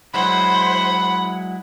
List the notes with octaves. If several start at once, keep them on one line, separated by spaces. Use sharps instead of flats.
F#3 G#3 E4 C5 F#5 B5